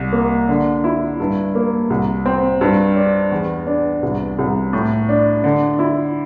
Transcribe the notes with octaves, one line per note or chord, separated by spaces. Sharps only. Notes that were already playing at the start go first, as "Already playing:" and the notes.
Already playing: C2
A#3
D3
E4
G2
A#3
C2
C4
G2
D4
E2
D4
C2
C2
A2
D4
D3
E4